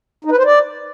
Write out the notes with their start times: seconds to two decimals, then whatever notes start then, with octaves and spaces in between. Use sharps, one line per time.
0.25 D#4
0.31 B4
0.38 C5
0.45 D5